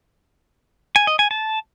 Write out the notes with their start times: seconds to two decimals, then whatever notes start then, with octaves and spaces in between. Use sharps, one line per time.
0.96 G#5
1.07 D#5
1.19 G#5
1.31 A5